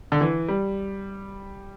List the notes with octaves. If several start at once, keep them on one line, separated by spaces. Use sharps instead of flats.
D3
E3
G3